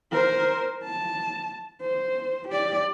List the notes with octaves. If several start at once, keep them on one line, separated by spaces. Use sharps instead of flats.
A#4 C5
A5
C5
G4 D5